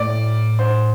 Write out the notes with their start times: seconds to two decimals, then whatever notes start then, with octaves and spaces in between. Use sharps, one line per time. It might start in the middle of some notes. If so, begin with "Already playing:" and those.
Already playing: A2 D5
0.59 C5